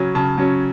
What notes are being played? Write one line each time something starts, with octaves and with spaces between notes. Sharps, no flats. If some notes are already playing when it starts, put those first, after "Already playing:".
Already playing: C#3 F#3 C#4
C#3 A5
F#3 C#4